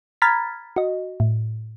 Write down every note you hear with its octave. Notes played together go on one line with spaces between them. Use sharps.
A#5 B5 F6 G#6 A6 B6
F#4 D#5
A2